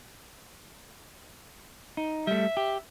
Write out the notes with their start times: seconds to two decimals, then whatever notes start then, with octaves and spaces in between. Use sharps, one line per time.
1.97 D#4
2.27 G3 A3 E5
2.57 G4